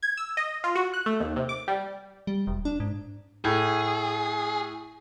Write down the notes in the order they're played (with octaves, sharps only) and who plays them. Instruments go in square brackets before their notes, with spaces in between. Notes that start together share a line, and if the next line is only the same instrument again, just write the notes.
[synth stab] G#6
E6
D#5
F4
F#4
F#6
A3
D#2
C3
D6
G3
[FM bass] G3
E1
D4
G#2
[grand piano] A2 [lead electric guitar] G#4